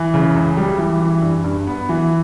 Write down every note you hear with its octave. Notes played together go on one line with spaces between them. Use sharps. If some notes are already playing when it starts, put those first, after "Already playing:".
Already playing: E3
C#3
C#2
G3
E3
E3
G2
G2
B3
E3